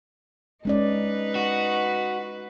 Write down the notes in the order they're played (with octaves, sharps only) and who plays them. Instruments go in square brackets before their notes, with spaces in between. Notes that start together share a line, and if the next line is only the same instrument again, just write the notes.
[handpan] G#3 C#4 D5 [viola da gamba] D#4 B4
[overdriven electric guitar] F#4